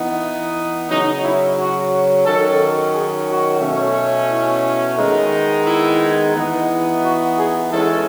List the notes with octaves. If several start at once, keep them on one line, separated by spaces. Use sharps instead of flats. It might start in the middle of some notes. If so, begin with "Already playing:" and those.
Already playing: E3 B3 D#4
C#3 F#3 C#4 D#4
E4
F#4
D#3 F#3 C#4 A4
G#4
F#4
B2 A3 C#4
E4
D#3 G#3 B3 D#4
E4
E3 B3 D#4
F#4
G#4
E3 G#3 C#4 A4